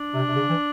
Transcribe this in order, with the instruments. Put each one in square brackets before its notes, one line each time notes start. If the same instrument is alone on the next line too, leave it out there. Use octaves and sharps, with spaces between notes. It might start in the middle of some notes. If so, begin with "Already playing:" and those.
Already playing: [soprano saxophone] D4
[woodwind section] C3
C3
C#3
E3